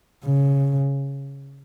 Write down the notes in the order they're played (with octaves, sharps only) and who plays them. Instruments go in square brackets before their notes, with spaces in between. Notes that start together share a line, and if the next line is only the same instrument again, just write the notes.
[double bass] C#3